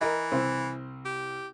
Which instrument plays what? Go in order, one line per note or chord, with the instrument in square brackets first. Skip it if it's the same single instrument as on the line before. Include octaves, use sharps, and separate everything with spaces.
[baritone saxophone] E3 [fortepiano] A#4 D#5
[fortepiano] C2 C4
[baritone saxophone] G4